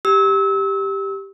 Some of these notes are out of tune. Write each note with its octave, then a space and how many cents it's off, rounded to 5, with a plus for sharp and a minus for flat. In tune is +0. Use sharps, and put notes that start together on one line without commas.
G4 +0 E6 -30